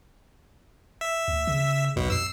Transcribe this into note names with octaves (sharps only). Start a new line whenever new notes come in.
E5
D2
C#3
B1 E2 B2
F2 E6 C7